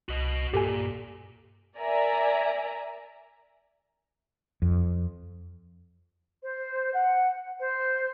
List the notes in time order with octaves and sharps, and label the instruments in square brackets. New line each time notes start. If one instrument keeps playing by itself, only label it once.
[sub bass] C2 [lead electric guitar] F#4 D#5
[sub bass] G2 [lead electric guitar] A#2 [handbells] G4 A4 G#5
[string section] A#4 D5 E5 G#5 A#5
[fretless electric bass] F2
[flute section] C5
F#5
C5